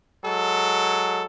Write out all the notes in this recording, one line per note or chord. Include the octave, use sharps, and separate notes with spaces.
F#3 G#3 A4